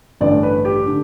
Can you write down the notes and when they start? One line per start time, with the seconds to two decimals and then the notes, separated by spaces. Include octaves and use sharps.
0.21 A1 G2 D3 D5
0.43 B4
0.65 G4
0.86 D3